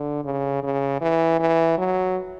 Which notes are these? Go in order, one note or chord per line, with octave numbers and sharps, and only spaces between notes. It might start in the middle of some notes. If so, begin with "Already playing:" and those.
Already playing: D3
C#3
C#3
E3
E3
F#3